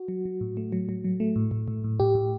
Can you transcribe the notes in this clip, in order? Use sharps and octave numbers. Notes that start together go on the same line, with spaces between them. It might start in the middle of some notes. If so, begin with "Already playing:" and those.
Already playing: F#4
F#3
F#3
A2
A3
F#3
F#3
F#3
A3
A2
A2
A2
A2
A2 G4
A2